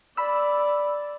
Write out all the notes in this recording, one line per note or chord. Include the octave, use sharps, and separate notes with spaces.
D5 B5 E6